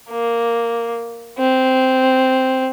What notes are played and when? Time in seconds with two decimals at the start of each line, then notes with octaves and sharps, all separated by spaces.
0.10 A#3
1.39 C4